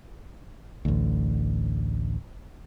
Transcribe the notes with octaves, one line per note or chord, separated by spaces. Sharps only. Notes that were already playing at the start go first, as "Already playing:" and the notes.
A1 D2